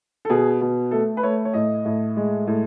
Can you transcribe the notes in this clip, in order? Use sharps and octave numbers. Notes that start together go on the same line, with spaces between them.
A4
B2 G#4
B2
A3 A4
B4
A3 C#5
C#5
A2 D#5
A2
G#3
A2